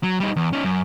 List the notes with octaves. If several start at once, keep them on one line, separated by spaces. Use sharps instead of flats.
F#3
G3 D#4
E2
C#4 D#4
F#2